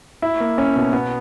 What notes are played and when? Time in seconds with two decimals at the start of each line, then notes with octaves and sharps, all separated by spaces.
0.22 E4
0.40 A#3
0.58 C#4
0.76 B2
0.93 B3